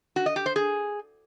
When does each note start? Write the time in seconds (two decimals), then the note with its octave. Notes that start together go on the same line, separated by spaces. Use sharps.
0.16 F#4
0.26 D#5
0.36 G4
0.46 C5
0.56 G#4